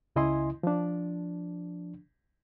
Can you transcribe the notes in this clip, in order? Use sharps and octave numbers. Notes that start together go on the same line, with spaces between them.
C#2 C#3 E4 D#5 G#5 C6
F3 D4